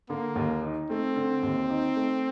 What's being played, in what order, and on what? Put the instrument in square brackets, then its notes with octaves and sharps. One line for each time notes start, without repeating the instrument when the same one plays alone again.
[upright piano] D3 [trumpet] A#3
[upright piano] D#2
D#4
[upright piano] A3 [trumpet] C4
[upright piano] D3
D#2
D#4
A3